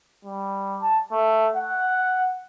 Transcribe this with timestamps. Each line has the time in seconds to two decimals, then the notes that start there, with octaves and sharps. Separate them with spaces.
0.25 G3
0.81 A5
1.12 A3
1.56 F#5